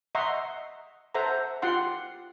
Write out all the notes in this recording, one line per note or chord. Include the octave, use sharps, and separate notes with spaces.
D#5 E5 F#5 A#5 C6 C#6
A4 C5 E5 F#5 A#5
F4 G4 F#5 C6